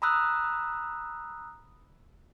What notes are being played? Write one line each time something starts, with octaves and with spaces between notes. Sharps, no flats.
A#5 B5 D#6 E6 F#6